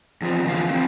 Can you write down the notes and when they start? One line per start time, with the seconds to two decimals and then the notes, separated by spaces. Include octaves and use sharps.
0.21 E2 F3 C4
0.46 D3 E3 F3 F5
0.70 C4 D#4 E4